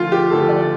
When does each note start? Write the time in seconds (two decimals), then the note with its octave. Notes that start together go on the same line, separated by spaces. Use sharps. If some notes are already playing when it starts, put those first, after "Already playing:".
Already playing: D2 D3 F3 F4
0.12 G4
0.31 D2 D3 F3 A4
0.49 D5